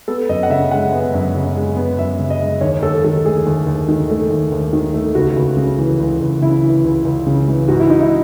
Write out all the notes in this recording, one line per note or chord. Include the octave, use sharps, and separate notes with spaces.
B3 A4
F#2 D#5
F#5
C#3 E5
G#3 F#5
B3
F#2
C#3
G#3
B3
F#2 E5
C#3
D#5
G#3
D#2 C#5
D#2 A4
D#3 A4
A3 G#4
D#2
D#2
D#3
A3
D#2
D#2
D#3
A3
C#2 F#4
C#2
C#3
E3
C#2
C#2
C#3 E4
E3
C#2
C#2
C#3
E3
G#2 F#4
E4
G#2 D#4
E4